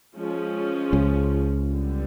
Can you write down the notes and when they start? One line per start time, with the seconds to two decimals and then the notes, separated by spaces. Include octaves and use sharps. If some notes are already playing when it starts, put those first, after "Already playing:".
0.15 F3 G#3 C#4
0.93 C#2 C#3
1.71 D3 G3 B3